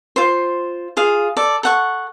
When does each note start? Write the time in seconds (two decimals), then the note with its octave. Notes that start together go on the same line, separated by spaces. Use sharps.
0.16 F4 C5
0.97 F4 G#4 F5
1.37 A4 D5
1.63 A4 F#5 C#6